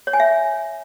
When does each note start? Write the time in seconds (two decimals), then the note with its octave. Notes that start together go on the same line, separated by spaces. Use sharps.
0.07 C#5
0.13 G#5
0.20 E5